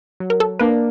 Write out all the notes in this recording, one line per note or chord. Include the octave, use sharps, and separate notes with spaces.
F#3
A#4
A4
A#3 D4 B4